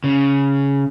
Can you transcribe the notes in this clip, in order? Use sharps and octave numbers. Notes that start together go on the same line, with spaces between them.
C#3